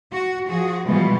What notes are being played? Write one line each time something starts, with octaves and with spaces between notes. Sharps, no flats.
F#4
F3 F#4 G#4
B2 E3 F3 G3 G#3 B3